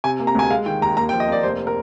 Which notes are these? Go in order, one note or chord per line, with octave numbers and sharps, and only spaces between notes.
C3 G#5
A#3
A#5
D2 G#5
G#3 F5
D#3 G5
D#2 A#5
A#3 A#5
G5
F3
D#5
A#3 D5
F1 C5
A#4